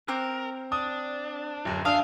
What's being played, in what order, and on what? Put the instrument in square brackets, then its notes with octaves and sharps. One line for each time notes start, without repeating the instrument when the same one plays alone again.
[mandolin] C4 D6 F#6 [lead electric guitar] A#4
[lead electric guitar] D4 [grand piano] D#6
[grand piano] D1 F#2
[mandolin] D4 [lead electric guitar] G#4 E5 [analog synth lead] F5 [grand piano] D#6